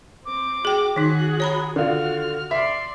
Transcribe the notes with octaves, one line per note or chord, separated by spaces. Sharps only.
C4 D6
F#4 G#4 G5
D#3 D#4 F#4 G#4 F#6
C#5 A#5 B5
D3 F4 F#4 F6
D5 E5 C6